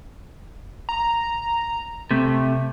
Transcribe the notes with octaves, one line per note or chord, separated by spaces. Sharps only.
F1
G#1 A#5
A#1
C3 A3